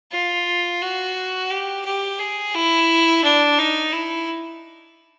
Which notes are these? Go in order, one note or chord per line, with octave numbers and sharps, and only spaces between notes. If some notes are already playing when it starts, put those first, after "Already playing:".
F4
F#4
G4
G4
G#4
E4
D4
D#4
E4